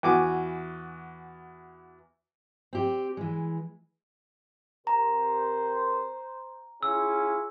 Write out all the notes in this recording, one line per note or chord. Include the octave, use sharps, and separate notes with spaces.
E2 E3 F#4 G#5 D6
C4 G4
E3 G#3
C3 G4 A#4 C5 A#5
C#4 E4 F4 G#4 E6